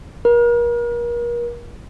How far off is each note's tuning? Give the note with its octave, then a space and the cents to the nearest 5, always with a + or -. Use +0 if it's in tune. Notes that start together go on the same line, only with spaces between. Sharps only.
A#4 +35